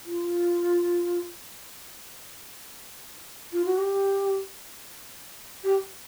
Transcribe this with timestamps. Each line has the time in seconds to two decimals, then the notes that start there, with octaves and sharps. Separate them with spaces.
0.05 F4
3.52 F4
3.64 F#4
3.77 G4
5.63 G4